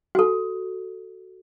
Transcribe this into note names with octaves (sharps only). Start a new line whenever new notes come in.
F#4 A4